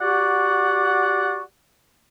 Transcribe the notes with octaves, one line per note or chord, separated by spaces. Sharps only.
F#4 G4 D5 F#5 C#6